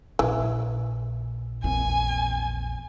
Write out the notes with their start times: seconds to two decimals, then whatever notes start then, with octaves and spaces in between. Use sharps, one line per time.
0.19 A#1 E3
1.64 A#1 E2 C4 G#5